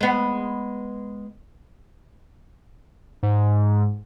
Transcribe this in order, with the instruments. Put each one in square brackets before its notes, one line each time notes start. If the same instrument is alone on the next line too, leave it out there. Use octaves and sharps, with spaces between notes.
[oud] G#3 B3
[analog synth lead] G#2